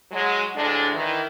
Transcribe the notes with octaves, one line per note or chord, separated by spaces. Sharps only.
F#3 G#3
D2 A2 G#3 D4
D#3 E3